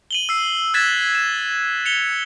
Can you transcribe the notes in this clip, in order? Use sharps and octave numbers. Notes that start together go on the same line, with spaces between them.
D#7 F#7 G7
E6 C7
E6 F#6 G#6 A6 B6 E7
E7
C#7 F7 G7